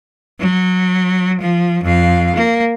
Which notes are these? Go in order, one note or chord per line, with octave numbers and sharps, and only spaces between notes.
F#3
F3
F2 F5
A#3